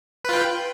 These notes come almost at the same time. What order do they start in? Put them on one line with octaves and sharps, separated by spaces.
B4 F4 G5